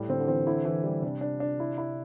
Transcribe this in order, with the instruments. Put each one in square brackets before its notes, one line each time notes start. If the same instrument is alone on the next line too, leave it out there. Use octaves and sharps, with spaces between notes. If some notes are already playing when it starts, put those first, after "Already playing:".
Already playing: [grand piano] A2 G3
[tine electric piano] D3 [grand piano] C4
[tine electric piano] D3
[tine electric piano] E3 [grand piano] C4
[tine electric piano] D3 [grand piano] E4
[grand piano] E3
G3
[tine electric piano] C3 [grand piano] D4
[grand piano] D4
D4
E4
E4